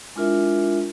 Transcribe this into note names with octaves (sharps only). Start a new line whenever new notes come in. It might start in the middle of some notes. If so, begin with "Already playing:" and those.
G#3 D4 E4 F4 A#4 E5